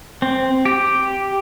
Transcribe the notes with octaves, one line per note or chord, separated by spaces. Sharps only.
C4
G4